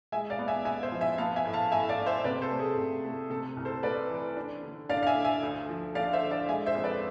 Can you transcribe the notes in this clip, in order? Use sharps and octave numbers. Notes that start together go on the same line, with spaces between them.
G#3 E5 G#5
D5 F5
B3
E5 G#5
B3 E5 G#5
C5 E5
F3
E5 G#5
B3 F5 A5
E5 G#5
A2
F5 A5
A2 E5 G#5
D5 F5
A2
C5 E5
C3 B4 D5
A4 C5
A3
G#4
C3
A3
C3 A4
C2
A4 C5
A3 B4 D5
E3
D4
D3
D4 D5 F5
F5
E5 G#5
A3
E5 G#5
D2
F3
D3 D5 F5
C5 E5
D3
D5 F5
G#3 E5 G#5
C5 E5
F2
B4 D5